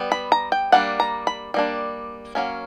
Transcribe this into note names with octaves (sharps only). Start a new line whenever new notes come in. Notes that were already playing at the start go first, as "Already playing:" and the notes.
Already playing: G3 B3
B5
A#5
G5
G3 A#3 D4 F#5
A#5
B5
G3 A#3 D4
F#3 A#3 C#4